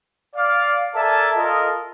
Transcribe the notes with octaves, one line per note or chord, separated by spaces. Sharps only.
D5 F5
A4 A#4 D5 E5 G#5 A5
F4 A4 A#4 D#5